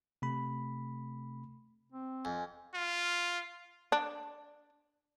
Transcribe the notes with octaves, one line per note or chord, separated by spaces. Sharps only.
C3 A3 B5
C4
F2 G#5
F4
D4